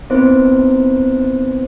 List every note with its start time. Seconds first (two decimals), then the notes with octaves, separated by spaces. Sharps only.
0.10 B3 C4 D#4 E4 B4 C5